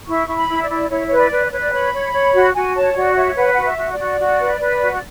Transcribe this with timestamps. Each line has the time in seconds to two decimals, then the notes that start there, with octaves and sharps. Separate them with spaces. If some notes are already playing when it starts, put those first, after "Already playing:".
0.08 E4 C#6
0.28 E4
0.35 B5
0.49 E4
0.63 D5
0.70 E4
0.90 E4 C#5
1.07 B4 C#5
1.17 D5
1.31 B4
1.45 D5
1.51 B4 C#5
1.59 D5
1.72 C#5 B5
1.94 C#5
2.13 C#5
2.34 F#4
2.54 F#4 G#5
2.75 C#5 A5
2.95 F#4 D5
3.16 C#5 E5
3.36 B4 F#5
3.53 F#4 F#5
3.65 E5
3.77 F#4
3.92 D5
3.99 F#4
4.19 F#4
4.39 B4
4.60 B4
4.81 F#4
4.92 D5